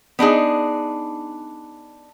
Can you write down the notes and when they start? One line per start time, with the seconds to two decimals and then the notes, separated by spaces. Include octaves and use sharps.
0.19 B3 D4 D#4 G#4